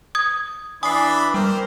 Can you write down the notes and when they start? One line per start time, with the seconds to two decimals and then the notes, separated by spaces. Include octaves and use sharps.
0.15 D#6 G#6
0.83 E3 D4 G#5 B5 D#6 C7
1.34 G3 A#4 C5